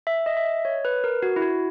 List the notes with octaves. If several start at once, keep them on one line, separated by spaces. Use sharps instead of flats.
E5
D#5
E5
D#5
C#5
B4
A#4
F#4
E4
F#4